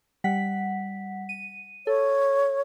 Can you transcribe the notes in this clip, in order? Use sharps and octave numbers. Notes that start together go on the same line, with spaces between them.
G3 F#5 B6
D#7
A4 C#5